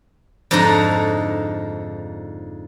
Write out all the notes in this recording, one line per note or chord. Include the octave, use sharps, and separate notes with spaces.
F2 G#2 D3 D#4 A4 A#5